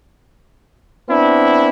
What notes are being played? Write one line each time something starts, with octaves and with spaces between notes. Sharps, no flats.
B3 C4 D4 E4